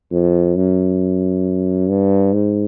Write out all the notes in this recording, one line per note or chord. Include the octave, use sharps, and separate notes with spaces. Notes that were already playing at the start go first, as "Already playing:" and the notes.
F2
F#2
G2
G#2